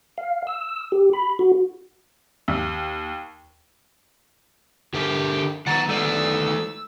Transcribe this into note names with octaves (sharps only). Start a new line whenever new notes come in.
F5
E6
G4
B5
F#4
D#2
D3 G4 A#4 E5
D#3 B3 F#5 A#5 A6
A3 D5 E6